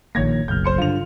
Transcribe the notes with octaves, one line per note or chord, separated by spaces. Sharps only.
A#1 D#3 A#3 C#5 G#6 A#6
F#1 B1 F6 G6
C5 C6 C#7
G2 D3 F4 F7